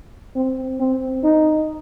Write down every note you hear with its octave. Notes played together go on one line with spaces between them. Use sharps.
C4
C4
D#4